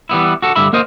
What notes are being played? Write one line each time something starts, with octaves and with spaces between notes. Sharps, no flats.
E3 G3 B3 E4
F#4 A4
G2 D3 E5 B5
A#3 A#4 C5 D#5